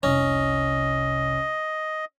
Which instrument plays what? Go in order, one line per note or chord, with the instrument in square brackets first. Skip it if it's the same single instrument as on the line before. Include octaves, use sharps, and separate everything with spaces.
[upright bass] F1 C2 [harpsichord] C#4 [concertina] D#5